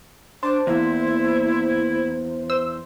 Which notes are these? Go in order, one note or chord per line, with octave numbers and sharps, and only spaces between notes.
D4 C5 A5
E2 A#3 E4
C5 E6